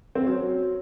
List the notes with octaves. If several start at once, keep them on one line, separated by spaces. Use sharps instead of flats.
C4
F#3 C#4